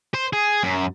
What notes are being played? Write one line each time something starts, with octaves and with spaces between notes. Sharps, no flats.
C5
G#4
F#2